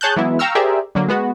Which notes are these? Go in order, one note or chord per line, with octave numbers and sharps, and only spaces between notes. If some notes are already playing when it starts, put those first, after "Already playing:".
G#4 C#5 A5 F#6 G6
E3 F#3 G#3 B3 E4
F5 G5 A#5 C#6 E6 F6
G4 G#4 A#4 C5 D5 E5
D3 F#3 A#3
G#3 B3 F#4